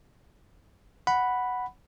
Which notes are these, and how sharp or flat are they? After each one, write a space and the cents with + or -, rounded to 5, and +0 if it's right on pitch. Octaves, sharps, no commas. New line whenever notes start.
F#5 +0 B5 +0